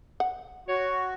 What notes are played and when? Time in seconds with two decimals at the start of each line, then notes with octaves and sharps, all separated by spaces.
0.20 F#5
0.68 F#4 C#5